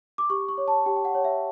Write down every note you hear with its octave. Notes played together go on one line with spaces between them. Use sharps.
D6
G4 C#6
C#6
C#5
A5
G4 G5
G5
F#5
C#5
E5